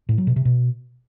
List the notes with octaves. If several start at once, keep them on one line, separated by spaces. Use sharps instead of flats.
A2
F#3
B2
C3
B2